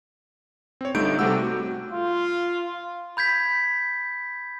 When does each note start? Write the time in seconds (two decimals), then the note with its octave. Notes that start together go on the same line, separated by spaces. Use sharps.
0.81 C4 C#5
0.95 G1 G2 A3 D#4 G6 D7
1.19 C3 G3 A3 G4 F#5 E6
1.37 F#4
1.92 F4
3.17 B5 G6 G#6 B6